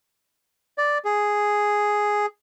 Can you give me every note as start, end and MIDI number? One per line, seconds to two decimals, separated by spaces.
0.78 0.98 74
1.05 2.26 68